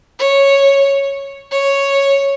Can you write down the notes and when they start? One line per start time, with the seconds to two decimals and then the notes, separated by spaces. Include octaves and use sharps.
0.19 C#5
1.51 C#5